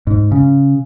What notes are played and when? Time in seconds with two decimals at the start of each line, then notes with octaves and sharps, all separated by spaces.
0.07 G#2
0.32 C#3